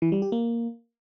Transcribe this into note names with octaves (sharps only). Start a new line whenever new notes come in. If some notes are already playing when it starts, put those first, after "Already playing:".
E3
G3
G4
A#3